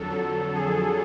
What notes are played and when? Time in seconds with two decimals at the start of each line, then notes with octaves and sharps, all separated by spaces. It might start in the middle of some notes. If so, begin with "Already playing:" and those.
Already playing: F2 D3 F#3 A4
0.11 A4
0.55 G#4